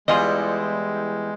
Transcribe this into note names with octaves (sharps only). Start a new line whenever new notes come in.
E2 G3 G#3 E4 F4 G#4 D#5